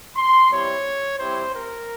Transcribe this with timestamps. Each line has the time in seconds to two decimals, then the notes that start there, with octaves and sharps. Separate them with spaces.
0.16 C6
0.50 G3 C4 E4 G4 C#5
1.19 G3 C4 E4 G4 C5
1.54 A#4